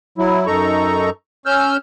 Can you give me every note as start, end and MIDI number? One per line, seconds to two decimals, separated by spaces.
0.18 0.46 54
0.18 0.46 64
0.47 1.10 42
0.47 1.10 63
0.47 1.10 69
0.47 1.10 82
0.47 1.10 85
1.46 1.77 61
1.46 1.77 88
1.46 1.77 89
1.46 1.77 91